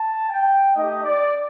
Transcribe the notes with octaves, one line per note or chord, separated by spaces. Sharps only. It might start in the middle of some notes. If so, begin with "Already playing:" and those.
Already playing: A5
G5
A3 D#4 G4 D#5
D5